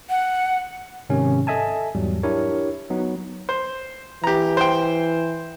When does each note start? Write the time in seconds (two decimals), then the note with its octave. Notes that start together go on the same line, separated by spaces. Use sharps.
0.10 F#5
1.09 G#2 C3 D#3 C#4
1.47 A4 D#5 E5 G#5 A5
1.95 E2 G#2 F#3 G3
2.23 D4 E4 G4 A#4 C#5
2.90 F#3 B3 D#4
3.49 C5
4.24 E3 G4 A#5
4.57 C5 G5